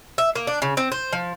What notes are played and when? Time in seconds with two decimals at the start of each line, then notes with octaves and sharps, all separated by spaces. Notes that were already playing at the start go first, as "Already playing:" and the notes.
0.18 E5
0.36 A#3
0.47 D4
0.62 C#3
0.77 C4
0.92 C5
1.13 F3